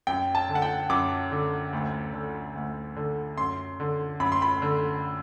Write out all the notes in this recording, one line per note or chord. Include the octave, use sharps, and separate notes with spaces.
F#2 G5
A5
D3
F#5
G5
F#2 D6
D3
D2
D3
D2
D3
F#2 C6
D3
F#2 B5
C6
B5
D3